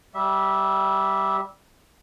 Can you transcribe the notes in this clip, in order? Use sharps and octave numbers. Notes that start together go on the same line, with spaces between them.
G3 E5